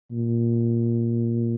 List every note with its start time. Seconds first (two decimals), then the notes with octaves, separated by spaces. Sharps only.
0.12 A#2